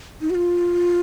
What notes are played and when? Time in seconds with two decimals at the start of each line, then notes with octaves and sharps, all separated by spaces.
0.21 D#4
0.30 F#4
0.35 F4